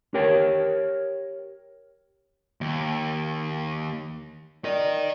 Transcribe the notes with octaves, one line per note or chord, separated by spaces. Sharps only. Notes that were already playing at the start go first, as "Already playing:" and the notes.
G4 A#4 C#5 G5
D#2
A#4 D5 D#5